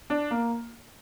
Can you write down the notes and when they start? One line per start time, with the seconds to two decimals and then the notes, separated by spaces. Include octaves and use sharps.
0.10 D4
0.31 A#3